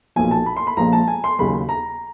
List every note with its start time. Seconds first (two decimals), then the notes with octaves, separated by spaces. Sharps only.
0.16 B1 A#2 F3 G#5
0.31 A5
0.46 B5
0.57 C6
0.67 B5
0.77 A#1 A#2 F3 G#3 A#5
0.93 A5
1.08 G#5
1.24 C6
1.39 D#2 C#3 F#3 B5
1.69 A#5